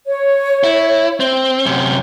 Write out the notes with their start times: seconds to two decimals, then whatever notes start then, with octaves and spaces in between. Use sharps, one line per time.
0.07 C#5
0.64 E4
1.20 C4
1.66 F#2 C3